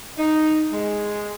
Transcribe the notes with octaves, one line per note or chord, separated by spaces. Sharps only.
D#4
G#3